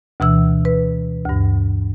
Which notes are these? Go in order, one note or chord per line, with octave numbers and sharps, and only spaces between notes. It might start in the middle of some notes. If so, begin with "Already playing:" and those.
D2 B2 E3 E6
B4
D2 G2